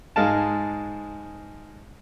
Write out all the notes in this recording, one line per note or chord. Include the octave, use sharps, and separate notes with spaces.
G#2 G#3 F5 A5